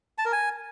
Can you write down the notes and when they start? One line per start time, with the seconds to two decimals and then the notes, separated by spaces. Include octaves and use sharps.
0.18 A5
0.25 A#4
0.32 G#5